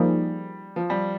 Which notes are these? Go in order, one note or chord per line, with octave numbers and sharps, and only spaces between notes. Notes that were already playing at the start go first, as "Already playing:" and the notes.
Already playing: F3 G3 A#3 D#4 G#4
F3
G3